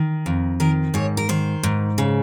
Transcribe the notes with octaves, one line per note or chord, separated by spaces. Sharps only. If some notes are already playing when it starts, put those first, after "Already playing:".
Already playing: D#3
F2
D#3 A#4
G#2 C#5
A#4
D#3 C5
G#2
C#3